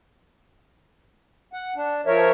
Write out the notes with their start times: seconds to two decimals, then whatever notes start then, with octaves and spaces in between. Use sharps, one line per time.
1.53 F#5
1.76 D4
2.07 F3 A#4 C#5 E5